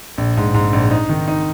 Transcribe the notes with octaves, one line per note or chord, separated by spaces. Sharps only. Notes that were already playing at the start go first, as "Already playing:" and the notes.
A#1
G#2
G#2
A#1
D#4
D#3
D#4